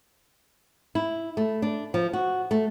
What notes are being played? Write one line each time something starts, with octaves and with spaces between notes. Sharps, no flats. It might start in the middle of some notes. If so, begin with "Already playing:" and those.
E4
A3
D4
F3
F#4
A3